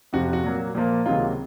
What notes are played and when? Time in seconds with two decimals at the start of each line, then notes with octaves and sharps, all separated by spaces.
0.13 F2 C3 F3 F#4
0.33 F#4
0.44 A#2 F#3 A#3
0.75 A#2 F3 A#3
1.06 C#2 C3 D#3 F#3 A#3 F4